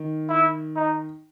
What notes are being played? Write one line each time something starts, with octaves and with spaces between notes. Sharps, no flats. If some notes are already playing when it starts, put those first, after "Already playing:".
Already playing: D#3
E4
D#4